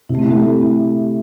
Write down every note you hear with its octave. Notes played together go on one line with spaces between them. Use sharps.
C3 E4
A3
C4
A3 E4 G4
A4